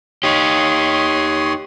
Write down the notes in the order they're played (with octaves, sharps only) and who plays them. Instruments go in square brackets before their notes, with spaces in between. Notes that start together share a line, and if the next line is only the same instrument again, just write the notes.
[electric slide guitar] D#4 G4 [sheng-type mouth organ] C#5 C6 D#6